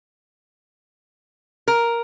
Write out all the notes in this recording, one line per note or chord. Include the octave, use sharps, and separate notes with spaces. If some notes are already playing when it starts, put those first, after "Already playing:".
A#4